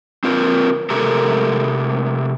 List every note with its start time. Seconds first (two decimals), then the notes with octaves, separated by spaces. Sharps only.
0.24 C4 F4 A#4 B4
0.90 C3 A3 G4 A4 A#4